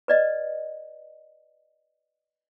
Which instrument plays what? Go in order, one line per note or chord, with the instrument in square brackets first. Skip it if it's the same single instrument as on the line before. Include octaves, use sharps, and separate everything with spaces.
[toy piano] B4 D5 D#5